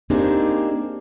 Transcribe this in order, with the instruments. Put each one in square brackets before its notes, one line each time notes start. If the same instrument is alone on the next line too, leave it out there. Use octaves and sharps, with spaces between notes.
[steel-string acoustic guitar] A#3 C4 D4 D#4 G4 G#4